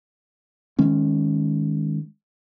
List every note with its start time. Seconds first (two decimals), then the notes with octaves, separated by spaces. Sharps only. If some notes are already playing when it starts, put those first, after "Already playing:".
0.79 D#3 G#3 C#4